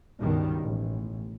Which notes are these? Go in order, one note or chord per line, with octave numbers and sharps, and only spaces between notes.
C#2 G2 B2 D#3 G3
A1